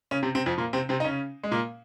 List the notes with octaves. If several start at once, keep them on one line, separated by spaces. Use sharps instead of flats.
C#3 C#4
C3 C4
C3 C4
F2 F3
A#2 A#3
C3 C4
C3 C4
D#4
C#3 C#4
G#3
A#2 A#3